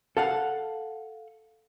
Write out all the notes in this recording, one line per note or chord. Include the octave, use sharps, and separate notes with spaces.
A4 F5 F#5